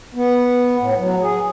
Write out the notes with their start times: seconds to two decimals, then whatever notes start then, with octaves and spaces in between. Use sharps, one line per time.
0.14 B3
0.79 A2
0.97 F#3
1.22 G#4